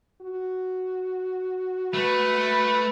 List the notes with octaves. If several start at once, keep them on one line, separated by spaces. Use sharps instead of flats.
F#4
A3 B4